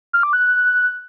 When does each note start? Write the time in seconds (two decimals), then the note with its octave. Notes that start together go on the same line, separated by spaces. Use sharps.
0.13 F6
0.23 D6
0.33 F#6